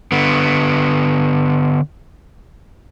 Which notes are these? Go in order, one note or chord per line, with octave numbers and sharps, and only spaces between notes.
D3 B3